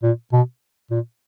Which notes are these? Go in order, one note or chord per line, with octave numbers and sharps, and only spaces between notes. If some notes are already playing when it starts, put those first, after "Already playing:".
A#2
B2
A#2